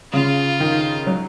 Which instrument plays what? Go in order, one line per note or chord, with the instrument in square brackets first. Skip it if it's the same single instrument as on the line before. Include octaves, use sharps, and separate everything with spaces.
[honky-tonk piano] C#3 [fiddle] F4
[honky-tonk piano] D#3
F#3